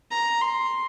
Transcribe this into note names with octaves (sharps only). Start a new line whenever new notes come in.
A#5
C6